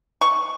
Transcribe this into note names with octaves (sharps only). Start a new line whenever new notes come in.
C#6